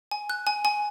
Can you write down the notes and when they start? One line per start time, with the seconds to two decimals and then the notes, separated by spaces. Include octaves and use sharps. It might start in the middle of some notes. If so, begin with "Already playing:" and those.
0.11 G#5
0.30 F#6
0.47 G#5
0.65 G#5